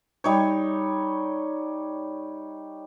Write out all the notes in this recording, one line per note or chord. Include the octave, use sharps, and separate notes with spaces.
G3 D#4 C#5